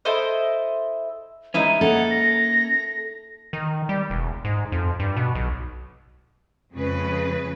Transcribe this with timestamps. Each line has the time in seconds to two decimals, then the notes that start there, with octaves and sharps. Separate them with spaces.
0.05 E4 A4 C5 D#5
1.54 G#3 C#4 D#4 E4 E5 D#7
1.81 A#3 C#4 A4 F#5
2.11 A#6
3.53 D#3
3.89 G3
4.10 E1
4.45 G#2
4.72 F2
4.99 G2
5.17 B2
5.35 B1
6.72 F2 C#3 G#3 B4